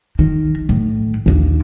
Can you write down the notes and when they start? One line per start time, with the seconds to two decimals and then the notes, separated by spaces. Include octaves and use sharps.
0.19 D#3
0.69 A2
1.26 A#1 D#2